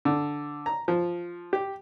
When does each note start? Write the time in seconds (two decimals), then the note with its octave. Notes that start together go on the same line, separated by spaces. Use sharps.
0.05 D3
0.66 A#5
0.88 F3
1.53 G4